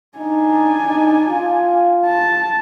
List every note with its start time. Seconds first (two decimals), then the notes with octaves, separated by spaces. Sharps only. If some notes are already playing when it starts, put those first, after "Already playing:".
0.18 D4 D#4 G#5
0.88 D#4
1.29 F4
2.06 A5